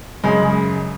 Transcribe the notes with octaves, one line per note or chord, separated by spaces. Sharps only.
F#2 C#3 G#3